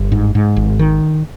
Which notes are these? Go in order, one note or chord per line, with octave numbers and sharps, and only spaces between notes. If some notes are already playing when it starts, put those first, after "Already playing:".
Already playing: G1
G#2
G#2
G#1
D#3